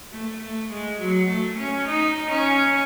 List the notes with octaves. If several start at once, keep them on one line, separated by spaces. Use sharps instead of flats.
A3
A3
G#3
F#3
A3
C#4
D#4
C#4